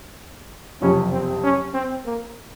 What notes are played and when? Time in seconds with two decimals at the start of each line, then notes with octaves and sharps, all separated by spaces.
0.82 F#1 F2 C3 C#4
1.12 C4
1.44 C#4
1.74 C4
2.05 A#3